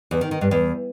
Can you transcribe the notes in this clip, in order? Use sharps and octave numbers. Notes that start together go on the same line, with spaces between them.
E2
D#3
D#3
G2
E2